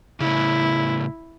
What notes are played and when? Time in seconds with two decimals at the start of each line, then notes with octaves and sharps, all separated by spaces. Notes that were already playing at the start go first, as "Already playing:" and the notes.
0.20 A2 C#3 E4